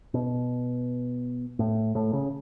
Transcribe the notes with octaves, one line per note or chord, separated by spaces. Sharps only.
B2
A2
A2
C#3